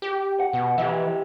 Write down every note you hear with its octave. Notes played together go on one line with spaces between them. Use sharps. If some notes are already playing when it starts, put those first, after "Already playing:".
G4
F#5
B2
E3 G4 D#5 E5